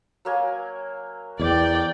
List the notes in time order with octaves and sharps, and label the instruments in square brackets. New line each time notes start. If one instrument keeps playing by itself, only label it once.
[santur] F#3 A#3 G#5
[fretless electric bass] E2 [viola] D5 G5